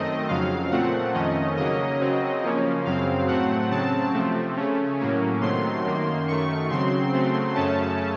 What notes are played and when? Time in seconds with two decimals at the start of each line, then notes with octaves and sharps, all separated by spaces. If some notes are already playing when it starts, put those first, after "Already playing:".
Already playing: F#2 D#3 A3 C4 D#5
0.28 F2 C#3 F#3 F5
0.71 A#2 F3 A3 C4 F#5
1.14 F2 D#3 A3 C#4 D#5
1.57 C#3 F#3 A#3 C#4 D#5
2.01 C#3 F#3 C4
2.43 C#3 F3 A#3 C#4
2.85 F#2 C#3 F#3 C4 F5
3.28 A2 F#3 A3 C4 F#5
3.71 C#3 F#3 C4 A5
4.13 C3 F3 A3 C4
4.57 C#3 A3 C#4
4.99 A2 F#3 A#3 C#4
5.41 C3 D#3 F#3 A3 C6
5.85 F#2 D#3 A#3
6.27 F#2 D#3 A3 C#6
6.70 C#3 F#3 C4 C6
7.13 C#3 F#3 A3 C4
7.55 F#2 C#3 A3 C#4 A5